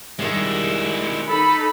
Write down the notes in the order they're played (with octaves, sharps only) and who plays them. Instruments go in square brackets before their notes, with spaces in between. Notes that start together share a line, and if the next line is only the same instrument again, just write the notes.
[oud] D#3 G3 [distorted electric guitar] G#3 E4
[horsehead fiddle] D#4 A4 [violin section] B5